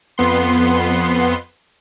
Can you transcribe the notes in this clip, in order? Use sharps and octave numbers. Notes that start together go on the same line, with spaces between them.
F2 B3 C6